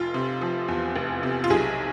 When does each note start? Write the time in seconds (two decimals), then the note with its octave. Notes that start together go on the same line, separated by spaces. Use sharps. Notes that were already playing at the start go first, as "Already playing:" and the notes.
Already playing: F1 F4
0.14 C3
0.41 F3
0.68 E2
0.96 F1
1.23 C3
1.44 F4
1.50 B1 G#4